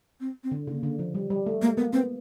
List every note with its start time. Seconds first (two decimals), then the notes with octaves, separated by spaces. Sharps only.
0.20 C4
0.44 C4
0.52 D3
0.67 C#3 A#3
0.83 D3
0.99 F3
1.15 G3
1.30 G3
1.46 A3
1.62 G#3 A#3
1.77 A#3 B3
1.93 B3 C4